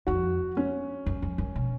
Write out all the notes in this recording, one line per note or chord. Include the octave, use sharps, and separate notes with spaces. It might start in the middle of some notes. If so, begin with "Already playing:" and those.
F2 F#4
C#4
F#2
F2
F#2
B2